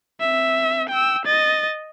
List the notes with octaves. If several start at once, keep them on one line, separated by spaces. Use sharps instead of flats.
C4 E5
G5 E6
D#5 A6